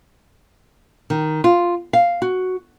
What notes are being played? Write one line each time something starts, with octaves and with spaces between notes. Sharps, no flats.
D#3
F4
F5
F#4